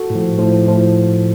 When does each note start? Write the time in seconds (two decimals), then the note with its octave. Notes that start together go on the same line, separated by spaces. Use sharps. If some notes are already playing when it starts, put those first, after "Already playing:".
Already playing: F#4 A4
0.10 A2 F3
0.38 A2 F3
0.66 A2 F3